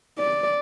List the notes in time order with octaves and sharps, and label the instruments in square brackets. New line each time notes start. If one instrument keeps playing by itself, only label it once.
[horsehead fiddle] D5